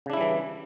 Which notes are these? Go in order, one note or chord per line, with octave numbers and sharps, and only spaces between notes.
C#3 E3 G3 D4 E4